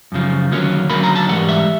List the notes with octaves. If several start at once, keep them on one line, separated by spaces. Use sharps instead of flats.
F#2 C#3 F3
D#2 D3 F#3 A#3 C#4
D#2 D3 F#3 A#3 C#4 B5
A#5
A5
G#2 E3 G3 F#5
E5